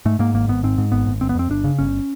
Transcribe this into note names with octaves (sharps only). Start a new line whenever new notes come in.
G#2 A3
G#2 A#3
G#1 A#3
G#1 B3
G#2 C4
G#2
G#1 B3
G#1
G1 C4
B3
F2 C4
G1 D4
C#3
G1 C#4